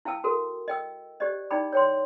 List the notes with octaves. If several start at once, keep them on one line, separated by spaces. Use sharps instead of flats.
E4 F5 G5 A5 E6
F#4 A4 A#4
D#5 G5 E6
G4 C5 D5 D#5
D#4 E4 D5 G5 B5 D6
C#5 G5 C6